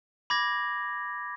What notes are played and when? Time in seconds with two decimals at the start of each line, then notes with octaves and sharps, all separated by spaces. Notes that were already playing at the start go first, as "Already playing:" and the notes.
0.30 B5 D6 G#6 A#6